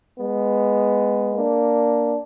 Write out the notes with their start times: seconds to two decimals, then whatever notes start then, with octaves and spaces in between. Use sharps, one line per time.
0.18 G#3 B3
1.35 A#3 D4